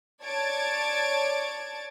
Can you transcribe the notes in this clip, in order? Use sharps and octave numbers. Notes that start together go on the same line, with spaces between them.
C#5 D5 A5 G#6 A6 D7